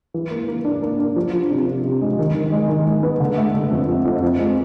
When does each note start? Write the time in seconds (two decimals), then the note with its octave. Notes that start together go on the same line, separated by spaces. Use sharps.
0.14 E3
0.31 A#3
0.48 A#3
0.65 D4
0.82 A#3
0.99 D4
1.16 F3
1.33 F3
1.50 C3
1.67 C3
1.84 C3
2.01 G#3
2.19 D#3
2.35 D#3
2.52 G#3
2.69 D#3
2.86 G#3
3.03 B3
3.20 D3
3.37 A3
3.54 A3
3.71 F2
3.88 F3
4.05 F2
4.22 F3
4.39 G#3